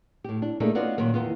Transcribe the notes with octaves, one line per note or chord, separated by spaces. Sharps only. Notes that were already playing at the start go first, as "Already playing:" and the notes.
A2 G4
D4
A3 A#3 D4 D#4 G#4
B3 C#4 D#4 F4 F#4 D5
A#2 D#3 F#3 A#3
E2 D#3 B3 F4